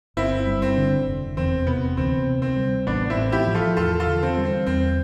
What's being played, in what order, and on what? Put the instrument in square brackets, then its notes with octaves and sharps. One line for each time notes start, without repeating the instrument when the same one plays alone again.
[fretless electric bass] G1 [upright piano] C4 E4
[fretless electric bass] G2
[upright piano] C4
[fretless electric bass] D3
F1
[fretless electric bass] E2 [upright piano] C4
[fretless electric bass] C3 [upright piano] B3
[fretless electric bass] D2 [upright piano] C4
[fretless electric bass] C3
[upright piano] C4
[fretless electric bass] G3
[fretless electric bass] A1 [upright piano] B3 D4
[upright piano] C4 E4
[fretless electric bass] A2
[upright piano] E4 G4
[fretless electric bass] F3
[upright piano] F4 A4
[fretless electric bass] E2 [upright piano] F4 A4
[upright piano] F4 A4
[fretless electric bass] D3
[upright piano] C4
[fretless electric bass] G3
[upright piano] C4
[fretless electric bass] E2 [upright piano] C4